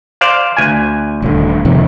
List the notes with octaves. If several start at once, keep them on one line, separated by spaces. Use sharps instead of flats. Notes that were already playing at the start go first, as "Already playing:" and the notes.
C5 D5 F5
D2 G#5
D#1 D3
F2 C3 D#3